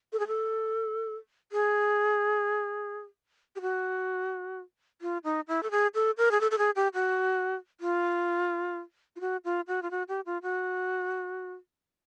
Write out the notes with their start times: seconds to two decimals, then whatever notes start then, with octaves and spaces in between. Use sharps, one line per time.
0.13 A4
0.19 G#4
0.27 A4
1.52 G#4
3.56 G4
3.61 F#4
5.01 F4
5.24 D#4
5.48 E4
5.63 A4
5.71 G#4
5.95 A4
6.18 A#4
6.31 G#4
6.41 A4
6.51 A4
6.58 G#4
6.76 G4
6.94 F#4
7.80 F4
9.16 F4
9.20 F#4
9.45 F4
9.68 F#4
9.82 F4
9.91 F#4
10.08 G4
10.26 F4
10.42 F#4